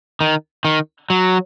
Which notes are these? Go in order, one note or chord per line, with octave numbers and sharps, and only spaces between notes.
D#3
D#3
F#3